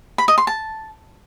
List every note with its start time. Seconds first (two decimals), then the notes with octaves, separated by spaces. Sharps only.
0.18 B5
0.28 D#5
0.38 C6
0.47 A5